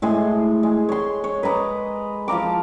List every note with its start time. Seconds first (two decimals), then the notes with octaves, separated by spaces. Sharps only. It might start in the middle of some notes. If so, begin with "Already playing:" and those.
0.02 A2 G#3 G#5 C6
0.63 G#3
0.89 C#5 C6
1.24 C#5
1.43 B4 D#5 A#5 D6
2.28 F3 F5 A#5 D6